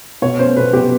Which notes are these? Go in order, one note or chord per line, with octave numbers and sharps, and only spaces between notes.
B2 C#5
C#4 C5
B2 B4
B2 G4